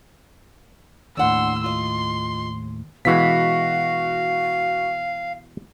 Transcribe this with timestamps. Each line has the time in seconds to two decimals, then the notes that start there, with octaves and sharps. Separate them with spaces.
1.17 D#2 A2 D4 F#5 C6 E6
1.64 F4 D#5 C6
3.05 B2 E3 G#3 F#4 F5 B6